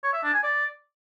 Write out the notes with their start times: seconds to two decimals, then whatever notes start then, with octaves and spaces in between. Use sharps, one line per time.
0.03 C#5
0.13 E5
0.23 D4
0.33 G#5
0.43 D5